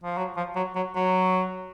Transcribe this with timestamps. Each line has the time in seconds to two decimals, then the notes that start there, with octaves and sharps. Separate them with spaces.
0.04 F3
0.17 F#3
0.37 F3
0.56 F#3
0.75 F#3
0.95 F#3